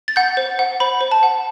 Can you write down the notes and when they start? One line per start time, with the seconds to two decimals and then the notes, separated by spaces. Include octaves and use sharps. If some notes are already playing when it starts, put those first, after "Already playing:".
0.08 A6
0.16 F#5 G6
0.37 C5
0.59 F#5
0.80 C5 B5
1.01 C5
1.12 A5
1.23 F#5